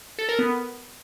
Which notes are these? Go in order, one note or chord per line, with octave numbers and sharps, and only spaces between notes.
A4
A#4
B3